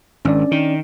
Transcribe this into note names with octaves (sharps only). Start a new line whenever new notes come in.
G#1 C#4 D4 D5
D#3